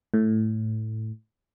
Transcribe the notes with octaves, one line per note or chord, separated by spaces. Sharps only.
A2